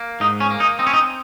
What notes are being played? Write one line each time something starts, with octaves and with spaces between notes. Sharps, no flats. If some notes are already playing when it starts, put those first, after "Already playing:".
Already playing: A#3
G#2 D#4
C#4
A#3
D#4
C4 D#4
C#4
D#4